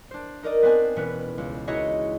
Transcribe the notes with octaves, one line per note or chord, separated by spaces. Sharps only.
D4 C5
D#4 A#4 D5 D#5
B3 C4 D4 C5 G#5
E1 C#4 B4
C#2
D#4 E4 F#4 G#4 C#5 D#5